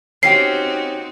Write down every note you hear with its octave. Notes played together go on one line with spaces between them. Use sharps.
C4 C#4 D#4 F#4 G4 C7